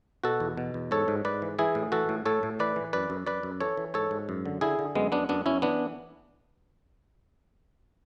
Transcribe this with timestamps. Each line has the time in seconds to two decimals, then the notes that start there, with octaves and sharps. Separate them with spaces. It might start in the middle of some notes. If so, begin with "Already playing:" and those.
0.24 B2 F#4 A4
0.40 E2
0.57 B2
0.74 E2
0.91 G#2 A4 C#5
1.08 G#2
1.25 G#2 B4 D5
1.42 E3
1.59 E3 E4 G#4
1.75 A2
1.92 E3 F#4 A4
2.09 A2
2.26 A2 A4 C#5
2.43 A2
2.59 E3 B4 D5
2.76 E3
2.93 F#2 B4 D5
3.10 F#2
3.27 F#2 B4 D5
3.43 F#2
3.61 E3 A4 C#5
3.77 E3
3.94 G#2 A4 C#5
4.11 G#2
4.29 F#2
4.45 D3
4.61 D3 E4 G#4
4.79 D3
4.95 F#2 G#3 B3
5.12 F#2 B3 D4
5.29 F#2 B3 D4
5.46 F#2 C#4 E4
5.62 E3 B3 D4